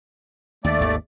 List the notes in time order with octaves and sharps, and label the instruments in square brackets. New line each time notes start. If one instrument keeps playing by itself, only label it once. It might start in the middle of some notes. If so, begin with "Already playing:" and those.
[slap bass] D#2 [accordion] A3 D5
[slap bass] G#1 D#2